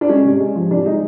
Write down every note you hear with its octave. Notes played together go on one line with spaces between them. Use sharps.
D4
G#3 C#4
C3
G#3
F3
C3 D4
G#3 D#4